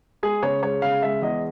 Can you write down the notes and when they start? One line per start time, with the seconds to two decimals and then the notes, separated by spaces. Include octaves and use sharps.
0.23 G#3 G#4
0.43 C#3 C#5
0.63 G#3 C#5
0.82 C#3 F5
1.02 G#3 E5
1.22 E2 D#5